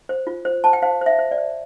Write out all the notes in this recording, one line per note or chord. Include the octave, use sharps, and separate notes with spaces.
C5
F4
C5
C5 A5
G5
C5 F5
C5 E5
C5
D5
C5